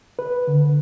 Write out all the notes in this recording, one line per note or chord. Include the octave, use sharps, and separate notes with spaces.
B4
D3